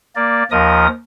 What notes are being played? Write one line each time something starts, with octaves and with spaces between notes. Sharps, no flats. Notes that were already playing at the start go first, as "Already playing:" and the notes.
A#3 D5
D#2 F3 A#4 D#5 D#6